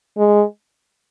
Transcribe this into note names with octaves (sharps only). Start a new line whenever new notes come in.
G#3